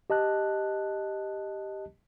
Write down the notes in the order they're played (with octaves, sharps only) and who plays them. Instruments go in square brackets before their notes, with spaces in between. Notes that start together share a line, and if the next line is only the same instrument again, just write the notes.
[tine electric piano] G4 D#5 A5 F#6